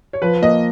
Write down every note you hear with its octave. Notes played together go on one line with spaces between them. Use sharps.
C#5
F3 B4
A#3 D#5